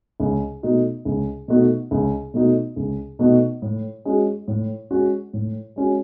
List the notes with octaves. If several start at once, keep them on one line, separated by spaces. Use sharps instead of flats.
C#2
B2 A3 D#4 F#4
C#2
B2 A3 D#4 F#4
C#2
B2 A3 D#4 F#4
C#2
B2 A3 D#4 F#4
A2
G#3 C#4 F#4
A2
G#3 C#4 F#4
A2
G#3 C#4 F#4